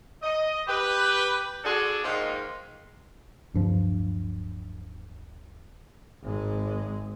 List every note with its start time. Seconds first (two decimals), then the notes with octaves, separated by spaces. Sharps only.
0.22 D#5
0.68 G4 B4
1.64 D4 F#4 G#4 A4 D5
2.04 G#2 D#3 G#3 A#3 F4
3.54 D1 G2 F3
6.23 G#1 G#3